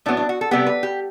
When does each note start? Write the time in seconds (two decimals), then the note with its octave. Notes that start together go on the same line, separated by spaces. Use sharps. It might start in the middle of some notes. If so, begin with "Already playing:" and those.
0.06 A2 F#3 B3 D4
0.17 D4
0.29 F#4
0.41 A4
0.51 C3 G3 B3 G4
0.67 B4
0.83 G4